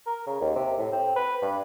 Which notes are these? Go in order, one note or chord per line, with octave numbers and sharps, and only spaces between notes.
A#4
C#3
D#2
C3
A2
C4
B4
G2